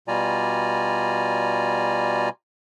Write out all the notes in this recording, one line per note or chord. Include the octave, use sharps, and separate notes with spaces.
B2 G3 F4 D5 G#5 A#5